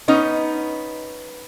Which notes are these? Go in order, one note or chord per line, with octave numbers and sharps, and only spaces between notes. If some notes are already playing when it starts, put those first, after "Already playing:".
B3 C#4 D#4